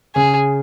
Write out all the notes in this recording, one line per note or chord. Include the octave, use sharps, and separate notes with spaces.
C#3 G#4